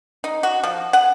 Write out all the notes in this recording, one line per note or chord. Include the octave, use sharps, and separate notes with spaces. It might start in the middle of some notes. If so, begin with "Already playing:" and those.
D#4
F#4
F3
F#5